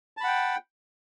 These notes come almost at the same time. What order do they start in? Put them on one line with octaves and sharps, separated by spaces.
A5 B5 F#5 G5